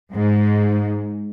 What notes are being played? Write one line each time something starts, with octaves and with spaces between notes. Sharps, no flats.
G#2